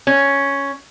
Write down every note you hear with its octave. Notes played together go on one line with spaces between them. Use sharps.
C#4